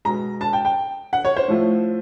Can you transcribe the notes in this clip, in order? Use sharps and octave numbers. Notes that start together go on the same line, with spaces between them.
B2 G#3 A#5
A5
G5
G5
F#5
C#5
C5
A2 F3 A3